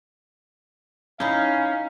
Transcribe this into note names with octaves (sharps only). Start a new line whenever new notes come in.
C#4 D#4 E4 F5